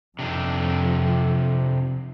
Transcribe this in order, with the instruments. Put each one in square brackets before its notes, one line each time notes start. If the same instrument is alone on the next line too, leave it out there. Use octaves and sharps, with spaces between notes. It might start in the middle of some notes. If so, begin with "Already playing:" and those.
[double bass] F2 [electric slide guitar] C3 D4 D#4